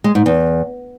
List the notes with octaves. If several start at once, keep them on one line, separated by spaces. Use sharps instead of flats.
G#3
G#2
E2